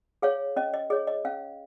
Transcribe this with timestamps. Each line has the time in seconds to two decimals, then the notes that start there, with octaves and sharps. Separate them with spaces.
0.22 G#4 C#5 F5
0.56 C#4 D#5
0.74 D#5
0.90 G#4 C#5 D#5
1.07 D#5
1.25 C#4 F5